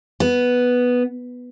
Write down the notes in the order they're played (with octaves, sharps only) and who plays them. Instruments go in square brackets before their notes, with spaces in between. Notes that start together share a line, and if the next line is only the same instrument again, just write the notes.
[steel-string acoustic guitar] B3